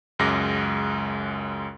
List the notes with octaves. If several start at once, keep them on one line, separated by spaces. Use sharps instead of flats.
C#2 F#2 G#3 D6 A#6